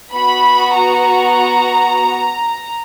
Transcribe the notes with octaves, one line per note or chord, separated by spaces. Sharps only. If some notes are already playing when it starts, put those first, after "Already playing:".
B3 F#4 B5
A#5